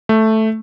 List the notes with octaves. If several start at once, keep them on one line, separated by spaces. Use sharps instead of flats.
A3